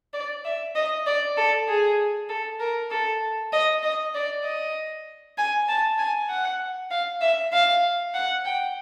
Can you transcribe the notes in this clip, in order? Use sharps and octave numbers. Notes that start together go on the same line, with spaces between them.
D5
E5
D#5
D5
A4
G#4
A4
A#4
A4
D#5
D#5
D5
D#5
G#5
A5
G#5
F#5
F5
E5
F5
F#5
G5